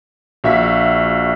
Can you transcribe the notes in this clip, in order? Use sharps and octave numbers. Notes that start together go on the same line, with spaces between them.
A#1 F#4 E5 F5 B6